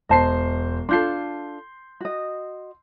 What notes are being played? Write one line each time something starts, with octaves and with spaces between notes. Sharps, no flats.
E1 C5 D#5 A5 C7
D4 F4 A4 C6 G6 C7
F#4 D#5